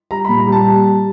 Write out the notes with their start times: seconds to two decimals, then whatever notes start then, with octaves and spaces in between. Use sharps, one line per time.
0.11 G3 A#5
0.25 A#2 B5
0.38 A#5
0.47 G3
0.52 A5